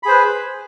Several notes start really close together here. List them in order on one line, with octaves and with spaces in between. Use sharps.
B5 G#4 C5 B4